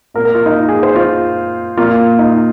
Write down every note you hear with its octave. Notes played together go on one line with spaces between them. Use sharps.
A#2 A#3 A#4
A#4
F4
D#4
G#4
C5
F4
A#2 A#3 F4
D#4